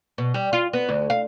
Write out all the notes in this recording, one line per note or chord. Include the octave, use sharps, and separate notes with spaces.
B2
G3
F4
B3
D2
F5